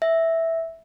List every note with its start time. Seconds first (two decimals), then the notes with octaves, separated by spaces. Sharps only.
0.02 E5